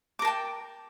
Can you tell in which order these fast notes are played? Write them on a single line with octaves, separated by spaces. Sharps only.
D6 A#4 A5 G5